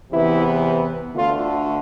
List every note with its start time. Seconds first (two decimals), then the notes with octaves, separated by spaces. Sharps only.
0.12 E2 C3 E3 B3 E4
1.15 D2 D3 A3 F4